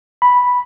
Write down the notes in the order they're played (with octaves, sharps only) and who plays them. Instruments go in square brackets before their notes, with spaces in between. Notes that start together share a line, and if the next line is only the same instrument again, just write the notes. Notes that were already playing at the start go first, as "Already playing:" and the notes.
[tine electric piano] B5